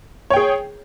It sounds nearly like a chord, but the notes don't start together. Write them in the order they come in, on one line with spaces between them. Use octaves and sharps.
C#5 G5 G#4